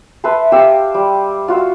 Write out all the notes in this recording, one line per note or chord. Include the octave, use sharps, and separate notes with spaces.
B4 E5 A5 C6
G4 F5 G5 E6
G3
F4 F#4 F5 E6